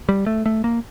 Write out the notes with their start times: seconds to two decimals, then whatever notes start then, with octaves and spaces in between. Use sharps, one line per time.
0.09 G3
0.26 A3
0.46 A3
0.64 A#3